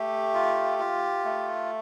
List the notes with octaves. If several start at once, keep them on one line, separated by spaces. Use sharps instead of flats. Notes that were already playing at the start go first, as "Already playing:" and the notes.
Already playing: A3 G4
F4
F4
A3